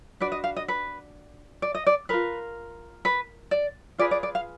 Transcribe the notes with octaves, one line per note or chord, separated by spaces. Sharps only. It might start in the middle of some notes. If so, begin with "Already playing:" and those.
D4 F#4 B4 D5
D#5
F5
D#5
B4
D5
D#5
D5
F4 A#4 B4
B4
D5
F4 G#4 B4 D5
D5
D5
F5